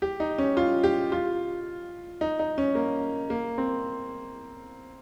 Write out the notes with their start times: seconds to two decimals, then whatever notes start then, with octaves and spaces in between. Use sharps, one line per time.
0.02 G4
0.20 D#4
0.38 C#4
0.57 F4
0.83 G4
1.12 F4
2.21 D#4
2.39 D#4
2.58 C#4
2.75 A#3
3.30 A#3
3.58 C4